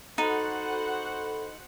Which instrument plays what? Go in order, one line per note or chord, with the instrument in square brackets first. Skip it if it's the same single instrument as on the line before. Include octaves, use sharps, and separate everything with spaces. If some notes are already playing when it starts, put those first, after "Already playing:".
[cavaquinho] D#4 [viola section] F#4 C5 F#5 [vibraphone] A4 B5